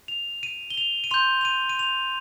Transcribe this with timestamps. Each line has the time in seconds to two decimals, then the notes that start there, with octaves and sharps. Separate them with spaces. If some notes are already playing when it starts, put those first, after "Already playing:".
0.08 F7
0.43 D#7
0.70 G7
0.77 F7
1.04 D#7
1.11 C6 G6 F7
1.41 F7
1.45 D#7
1.69 D#7
1.79 F7